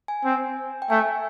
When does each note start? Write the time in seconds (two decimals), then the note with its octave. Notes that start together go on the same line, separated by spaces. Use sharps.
0.08 G#5
0.24 C4
0.82 G5
0.90 A3 G#5